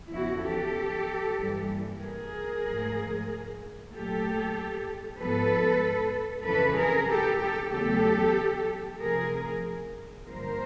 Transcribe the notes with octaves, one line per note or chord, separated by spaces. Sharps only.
E2 C#3 F3 E4 F#4
G4 A4
G2 E3 G3 A#3
G#4 A#4
G#2 F3 A3
A#2 F#3 A3 G4 A4
G#2 F3 G#3 B3 A4 B4
F2 C#3 E3 A4 B4
G#4 A#4
G4 A4
G4 A4
E2 C#3 F#3 A3 G4 A4
C3 F3 A3 G#4 A#4
G2 D3 F3 A#3 A#4 C5